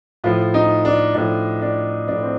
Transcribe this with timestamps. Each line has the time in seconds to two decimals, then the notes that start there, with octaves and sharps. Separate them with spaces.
0.24 A2 F3 F4
0.54 D#4
0.85 D4
1.15 A2 F3 D4
1.62 D4
2.07 A2 F3 D4
2.23 C4